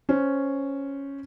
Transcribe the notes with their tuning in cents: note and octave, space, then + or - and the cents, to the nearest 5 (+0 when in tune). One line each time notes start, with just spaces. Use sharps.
C#4 +0 C5 +0